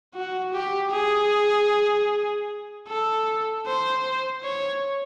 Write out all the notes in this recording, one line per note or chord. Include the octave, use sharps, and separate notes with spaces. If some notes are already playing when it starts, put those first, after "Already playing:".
F#4
G4
G#4
A4
C5
C#5